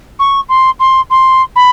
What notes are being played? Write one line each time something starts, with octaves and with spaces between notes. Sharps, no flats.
C#6
C6
C6
C6
B5